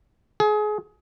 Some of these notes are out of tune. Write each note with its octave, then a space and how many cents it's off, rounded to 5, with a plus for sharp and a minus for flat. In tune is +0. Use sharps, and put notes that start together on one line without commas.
G#4 +30